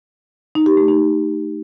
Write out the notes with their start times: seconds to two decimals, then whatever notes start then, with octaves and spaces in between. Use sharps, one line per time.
0.55 D#4
0.66 G4
0.77 A3
0.88 D#4